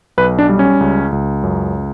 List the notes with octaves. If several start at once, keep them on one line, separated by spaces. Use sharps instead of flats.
B1 B4
D4
G3
C#4
C#2
C#2
F#2